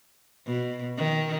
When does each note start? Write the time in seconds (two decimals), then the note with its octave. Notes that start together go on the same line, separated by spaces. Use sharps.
0.47 B2
0.97 D#3